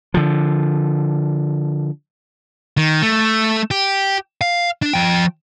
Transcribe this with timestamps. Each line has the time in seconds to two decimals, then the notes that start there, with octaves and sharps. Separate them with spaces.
0.14 D3 F3
2.77 D#3
3.02 A3
3.71 G4
4.41 F5
4.82 D4
4.93 F3 G5